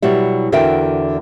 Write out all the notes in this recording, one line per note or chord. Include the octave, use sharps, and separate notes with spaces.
B2 F#3 G3 E4
E2 D3 F#4 A#4 E5 G5